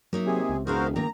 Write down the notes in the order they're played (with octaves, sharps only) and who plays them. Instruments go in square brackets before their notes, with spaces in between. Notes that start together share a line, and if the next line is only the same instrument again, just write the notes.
[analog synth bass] F#3 [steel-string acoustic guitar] A#3 D#4 E5
[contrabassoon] C3 [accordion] G#4
[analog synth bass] C#2
[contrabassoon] E1 [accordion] F#4 A#4 C5 [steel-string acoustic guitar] G#4 E5 F5
[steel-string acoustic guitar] D#3 A#3 [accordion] A#5